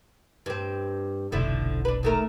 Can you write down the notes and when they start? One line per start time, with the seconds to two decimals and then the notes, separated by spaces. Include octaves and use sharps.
0.46 G2 C4
1.32 F1 B1 D3 F3 E4
1.85 D4 B4
2.03 D#2 A3 A#4